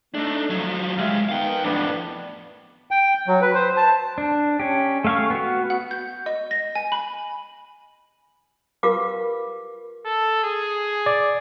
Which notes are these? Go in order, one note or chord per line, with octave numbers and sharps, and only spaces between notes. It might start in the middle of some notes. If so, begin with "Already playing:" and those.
A3 D4 D#4
F3 F#3
C2 G3 G#3 E5 F5
D#3 B3 F5 G5
F2 A2 B3 D4
G5
F#3
B4
C5
A5
D4
C#4 G4
A3 F5 C#6
B3 F#4
F#5
G6
D#5
A#6
G#5
B5
F4 G4 A#4 B4 F5 D6
A4
G#4
D5